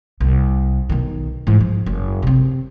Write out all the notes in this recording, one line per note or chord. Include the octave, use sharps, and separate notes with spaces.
C2
B1 D#3
G#2 E3
F3
F#1
C3 C4